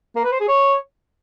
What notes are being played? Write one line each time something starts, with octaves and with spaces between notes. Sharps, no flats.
A#3
B4
C5
G#4
C#5